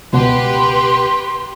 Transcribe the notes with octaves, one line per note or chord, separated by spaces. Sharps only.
C#2 B2 G4 B4 F#5 C6